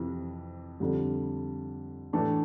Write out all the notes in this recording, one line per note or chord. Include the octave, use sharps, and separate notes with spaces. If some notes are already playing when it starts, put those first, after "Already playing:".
Already playing: F2 C3 E3
F2 D3 G3
A2 E3 A3 D4